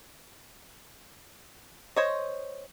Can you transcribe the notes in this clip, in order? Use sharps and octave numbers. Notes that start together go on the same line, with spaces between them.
C5 C#5 D#5